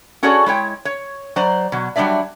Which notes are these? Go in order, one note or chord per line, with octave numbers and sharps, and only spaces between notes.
C#4 F#4 G#4 A4 C#5 D5
G#3 E4 C#5 G5
C#5
F#3 C5 D5 A#5
B2 F#3
F#3 G3 A#3 D4 D5 E5